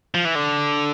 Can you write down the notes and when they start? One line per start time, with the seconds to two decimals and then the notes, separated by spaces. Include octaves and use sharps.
0.15 F3
0.25 E3
0.35 D3